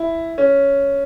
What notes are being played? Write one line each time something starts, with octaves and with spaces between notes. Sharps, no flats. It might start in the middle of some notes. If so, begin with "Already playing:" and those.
Already playing: E4
C#4